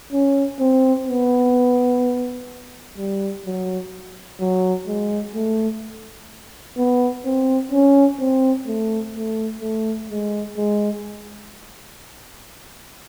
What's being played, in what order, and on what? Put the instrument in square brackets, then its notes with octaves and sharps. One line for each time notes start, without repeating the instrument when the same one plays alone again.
[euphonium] C#4
C4
B3
G3
F#3
F#3
G#3
A3
B3
C4
C#4
C4
A3
A3
A3
G#3
G#3